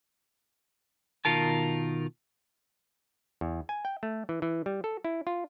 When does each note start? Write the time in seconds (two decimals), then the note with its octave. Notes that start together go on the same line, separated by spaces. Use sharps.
1.25 B2 D#3 F4 A#4 A5
3.41 E2
3.69 G#5
3.85 G5
4.03 A3
4.29 E3
4.42 E3
4.66 G3
4.84 A4
5.05 E4
5.27 F4